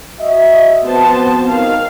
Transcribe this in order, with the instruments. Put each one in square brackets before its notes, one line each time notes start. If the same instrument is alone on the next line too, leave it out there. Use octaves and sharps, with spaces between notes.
[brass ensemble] F#4 D#5 E5
[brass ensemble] F3 C4 F#4 [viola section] B3 C5 A5
[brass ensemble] D#3 [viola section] F5